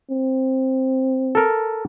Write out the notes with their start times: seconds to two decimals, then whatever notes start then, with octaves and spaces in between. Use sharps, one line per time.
0.10 C4
1.35 A4 A#4